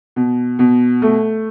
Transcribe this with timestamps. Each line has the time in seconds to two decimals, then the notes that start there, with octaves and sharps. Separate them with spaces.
0.16 B2
0.59 B2
1.02 A3